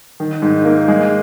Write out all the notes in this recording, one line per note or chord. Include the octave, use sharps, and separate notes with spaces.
D#3
G#2
A#3
G#3